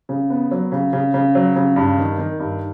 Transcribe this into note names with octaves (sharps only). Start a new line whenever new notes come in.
C#3
B3
F#3
C#3
C#3
C#3
F#3
C#3
G2
D#3
D#3
G2